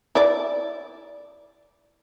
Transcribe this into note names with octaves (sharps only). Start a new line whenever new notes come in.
E4 D5